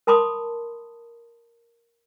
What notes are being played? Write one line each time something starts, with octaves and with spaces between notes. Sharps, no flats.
A#4 A5 B5 C6 D6 D#6